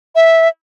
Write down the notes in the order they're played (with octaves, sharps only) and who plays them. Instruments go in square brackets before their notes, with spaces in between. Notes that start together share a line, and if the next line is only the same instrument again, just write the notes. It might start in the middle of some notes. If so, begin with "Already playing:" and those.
[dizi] E5